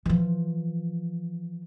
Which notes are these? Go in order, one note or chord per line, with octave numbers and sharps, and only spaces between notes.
E3 F3